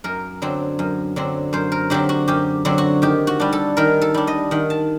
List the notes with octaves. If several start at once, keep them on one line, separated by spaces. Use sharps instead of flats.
F#2 A#4
D3 F#3 C4
F#2
D3 F#3 C4
F#2 C5
A#4
D3 F#3 C4 G4
F#4
F#2 G4
D3 F#3 C4
F#4
D#3 G4
F#4
G3 D4
A4
D#3 A#4
A4
G3 D4
D#5
D#3 F#5
A5